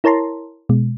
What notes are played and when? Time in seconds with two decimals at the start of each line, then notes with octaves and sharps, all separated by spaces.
0.04 E4 A#4 C#5 A5 A#5 C6
0.69 B2 G#3